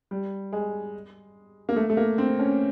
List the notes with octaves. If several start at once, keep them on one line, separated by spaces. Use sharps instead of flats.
G3
G#3
A#3
A3
A3
A#3
C4
C#4